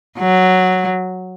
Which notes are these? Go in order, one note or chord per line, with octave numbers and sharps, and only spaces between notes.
F#3